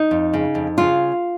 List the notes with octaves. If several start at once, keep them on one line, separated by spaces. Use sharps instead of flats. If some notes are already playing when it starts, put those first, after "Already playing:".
Already playing: D#4
F2
C#3
F2
C#3 F4